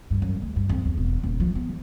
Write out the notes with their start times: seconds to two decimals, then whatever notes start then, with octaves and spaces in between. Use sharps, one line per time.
0.10 G2
0.22 F#2
0.42 D2
0.56 G2
0.69 F2
0.85 E2
0.97 E1
1.23 D#1
1.40 F3
1.55 B3
1.69 F3